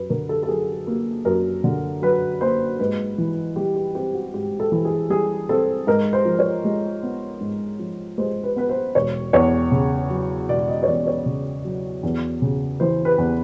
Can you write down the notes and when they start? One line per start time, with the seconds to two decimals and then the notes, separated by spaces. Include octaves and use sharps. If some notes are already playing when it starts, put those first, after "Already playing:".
Already playing: F#2 B4
0.10 D3 A#4
0.29 A4
0.43 A4
0.48 F#3 G#4
0.87 A#3
1.25 F#2 A#4
1.64 D3
2.02 F#3 B4
2.41 A#3 C5
2.79 G#2 B4
3.18 E3
3.56 G3 G4
3.76 G4
3.95 C4 G4
4.14 F#4
4.34 G#2 G4
4.60 A4
4.72 E3
4.85 G#4
5.10 G3 G#4
5.49 C4 A4
5.87 G#2 A#4
6.13 C5
6.25 F3
6.39 C#5
6.65 G#3
7.03 B3
7.41 G#2
7.79 F3
8.18 G#3 C5
8.43 B4
8.56 B3 B4
8.69 C5
8.95 E1 C#5
9.33 E2 C#5
9.72 C#3
10.10 F#3
10.49 E1 D5
10.68 D#5
10.83 C#5
10.87 E2 D5
11.07 C#5
11.26 C#3
11.65 F#3
12.03 E2
12.42 C#3
12.80 E3 C5
13.05 B4
13.18 E2